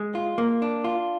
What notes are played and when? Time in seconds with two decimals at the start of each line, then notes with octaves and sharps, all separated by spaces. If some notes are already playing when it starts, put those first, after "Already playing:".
Already playing: G#3
0.15 F4
0.38 A#3
0.62 D4
0.84 F4